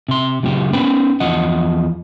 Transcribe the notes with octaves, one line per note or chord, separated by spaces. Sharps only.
C3 C6
F#2 A#2 C#3 G4
B3 C#4 B4 G5 B5
E2 F3 D#5 F#5